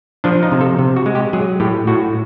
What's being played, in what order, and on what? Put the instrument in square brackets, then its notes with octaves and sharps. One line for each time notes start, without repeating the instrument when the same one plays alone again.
[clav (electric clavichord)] F3 D4
D#4
C3
A4
C3
F#4
G#3
G4
F#3 G#4
A2 G4
A2 F#4